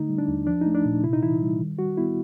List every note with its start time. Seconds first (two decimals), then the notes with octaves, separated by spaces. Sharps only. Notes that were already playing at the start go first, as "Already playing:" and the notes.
Already playing: D3 A3 D#4
0.09 G3
0.18 D4
0.28 D#2
0.47 F3 D4
0.61 D#4
0.66 A3
0.75 D4
0.85 A#2
1.03 C3 E4
1.13 D#4
1.23 E3 E4
1.42 G3
1.60 D#3
1.79 G3 F#4
1.98 B3 E4